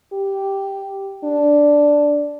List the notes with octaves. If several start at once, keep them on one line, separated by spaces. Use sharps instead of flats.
G4
D4